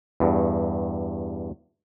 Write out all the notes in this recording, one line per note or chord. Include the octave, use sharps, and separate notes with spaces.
E2 G2